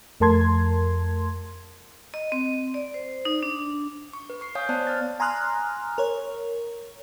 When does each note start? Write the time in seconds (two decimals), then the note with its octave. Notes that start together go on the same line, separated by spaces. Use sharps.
0.20 F2 A3 A#4 A5 C6 G#6
2.14 D#5
2.32 C4
2.74 D5
2.94 C5
3.25 D#4
3.43 D4
4.13 C#6
4.30 B4
4.41 C#6 C7
4.55 C#5 F5 G#5 D#6 G6
4.69 B3 C5 D5 A5 F#6
4.87 F6 A6
5.20 G#5 A#5 C6 D#6 F6 F#6
5.98 A#4 C#5